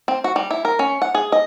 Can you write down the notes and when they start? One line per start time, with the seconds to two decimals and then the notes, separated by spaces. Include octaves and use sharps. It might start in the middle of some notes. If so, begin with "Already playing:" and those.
0.08 C4
0.24 F#4
0.36 G3
0.51 E4
0.65 A#4
0.79 C#4
1.02 F#5
1.15 G#4
1.32 D#5